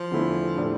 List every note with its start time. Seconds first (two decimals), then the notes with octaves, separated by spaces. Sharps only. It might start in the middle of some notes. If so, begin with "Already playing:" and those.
Already playing: F3
0.11 E2 D3 A3 E4
0.57 A2 G3 D4 A4